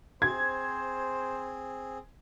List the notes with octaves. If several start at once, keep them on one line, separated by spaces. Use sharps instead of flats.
C4 G#4 C5 G#6